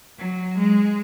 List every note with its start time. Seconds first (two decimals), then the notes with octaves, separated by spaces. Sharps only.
0.18 F#3
0.58 G#3